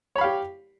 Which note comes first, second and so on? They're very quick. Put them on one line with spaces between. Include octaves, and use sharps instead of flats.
C#5 B5 F5 G4